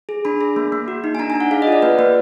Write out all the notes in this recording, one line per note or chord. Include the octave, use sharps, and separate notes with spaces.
G#4
D4 B5
G#4
A#3
A#3
F#4
D#4
G#5
D4 A#5
G#5
D4
F#5
G#4 F5
D#5
F4 D5
A#3 B4
A#3 B4